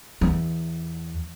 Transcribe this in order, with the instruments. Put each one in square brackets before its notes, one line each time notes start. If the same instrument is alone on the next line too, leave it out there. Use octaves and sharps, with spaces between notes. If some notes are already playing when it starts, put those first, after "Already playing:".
[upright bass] E2